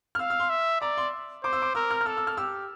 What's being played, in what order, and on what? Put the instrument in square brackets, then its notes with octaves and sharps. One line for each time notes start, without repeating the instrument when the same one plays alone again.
[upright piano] F6
[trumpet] F5 [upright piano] E6
[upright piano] E6
C6
[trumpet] E5
[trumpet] D5 [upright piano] A#5
[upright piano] C6
[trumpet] C5 [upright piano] D6
[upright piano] E6
D6
[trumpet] A#4 [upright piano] E6
[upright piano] F6
F6
[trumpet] A4 [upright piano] E6
[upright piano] E6
F6
[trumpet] G4 [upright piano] E6